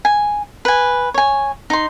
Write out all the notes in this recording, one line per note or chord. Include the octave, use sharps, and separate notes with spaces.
G#5
B4 G#5
C#5 G#5
D#4 C6